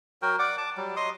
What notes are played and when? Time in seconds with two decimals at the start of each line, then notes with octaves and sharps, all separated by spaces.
0.22 F#3 F#4 A#4 G5
0.39 D5 F#5 D6
0.58 A5 D6
0.77 F#3 G3
0.96 F#3 D#5 C6 D#6